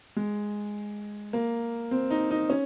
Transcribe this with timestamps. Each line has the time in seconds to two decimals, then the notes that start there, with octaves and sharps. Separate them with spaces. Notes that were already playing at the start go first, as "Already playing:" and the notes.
0.16 G#3
1.33 A#3
1.91 C4
2.11 D#4
2.31 D#4
2.50 C#4